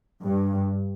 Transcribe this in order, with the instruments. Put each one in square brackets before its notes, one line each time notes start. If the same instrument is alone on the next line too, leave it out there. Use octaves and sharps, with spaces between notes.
[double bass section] G2